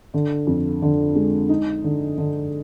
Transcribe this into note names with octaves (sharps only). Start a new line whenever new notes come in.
D3
F2
D3
G#3
D#4
D3
D3